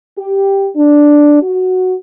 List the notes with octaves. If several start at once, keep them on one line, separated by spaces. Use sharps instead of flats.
G4
D4
F#4